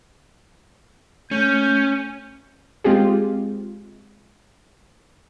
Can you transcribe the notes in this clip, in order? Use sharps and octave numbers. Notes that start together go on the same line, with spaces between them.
A3 C#4 G6
G#3 C4 F4 G4 G#4